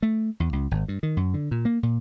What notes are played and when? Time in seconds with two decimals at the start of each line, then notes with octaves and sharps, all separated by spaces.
0.03 A3
0.40 E2
0.53 C#2
0.71 G#1
0.88 G2
1.03 D#3
1.17 F#2
1.34 D3
1.51 A#2
1.65 A#3
1.83 A#2